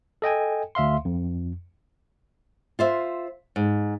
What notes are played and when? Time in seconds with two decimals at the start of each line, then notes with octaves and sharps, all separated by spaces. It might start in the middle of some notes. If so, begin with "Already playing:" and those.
0.22 A4 D#5 G5 G#5
0.75 D2 E5 F5 C6
1.05 F2
2.79 F4 C5 E5
3.56 G#2